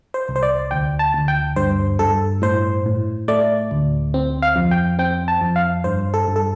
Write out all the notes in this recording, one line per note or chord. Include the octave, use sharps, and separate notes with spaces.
C5
C2
C5
D5
D2 G5
A5
D2
G5
G2 C5
G2 A4
A2 C5
A2
A3 D5
D2
C4
F5
F2
G5
C4 G5
A5
F2
F5
G2 C5
A4
G2
A4